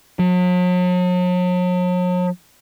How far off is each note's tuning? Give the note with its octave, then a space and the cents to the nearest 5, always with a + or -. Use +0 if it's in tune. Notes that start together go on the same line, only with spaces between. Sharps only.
F#3 -45